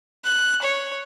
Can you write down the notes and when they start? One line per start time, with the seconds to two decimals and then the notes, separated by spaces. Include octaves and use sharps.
0.24 F#6
0.62 C#5